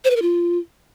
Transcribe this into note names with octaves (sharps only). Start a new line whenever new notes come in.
C5
B4
A#4
F4